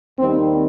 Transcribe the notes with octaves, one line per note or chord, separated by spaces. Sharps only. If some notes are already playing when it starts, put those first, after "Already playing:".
D#2 D#3 G3 C4